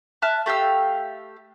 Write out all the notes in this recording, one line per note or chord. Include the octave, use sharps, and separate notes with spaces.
E5 A5 F6 F#6
A3 G4 F5 E6